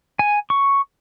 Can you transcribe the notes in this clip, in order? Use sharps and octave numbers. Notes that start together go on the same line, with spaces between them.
G#5
C#6